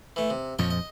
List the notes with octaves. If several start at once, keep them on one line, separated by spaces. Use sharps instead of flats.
E3 A3
C3
F2 A#2 F3 C#5 D#5
D#5